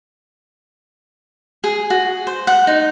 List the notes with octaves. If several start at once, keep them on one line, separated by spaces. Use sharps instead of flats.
G#4
F#4
C5
F#5
D#4